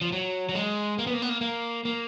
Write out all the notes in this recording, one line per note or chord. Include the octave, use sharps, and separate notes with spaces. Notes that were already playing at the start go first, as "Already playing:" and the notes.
F3
F#3
F#3
G#3
A#3
B3
A#3
B3
A#3
A#3
A#3